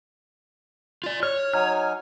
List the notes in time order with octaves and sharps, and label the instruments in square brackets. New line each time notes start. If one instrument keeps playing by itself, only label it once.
[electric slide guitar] F4 D5
[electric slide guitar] C#5 [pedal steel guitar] F6
[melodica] F#3 D#4 G#5 [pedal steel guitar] F6